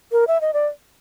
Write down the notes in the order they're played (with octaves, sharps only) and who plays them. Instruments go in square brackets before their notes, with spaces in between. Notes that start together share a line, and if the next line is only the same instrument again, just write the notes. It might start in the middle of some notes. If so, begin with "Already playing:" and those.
[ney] A#4
E5
D#5
D5